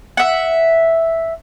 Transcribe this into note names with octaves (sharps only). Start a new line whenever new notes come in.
E5 F#5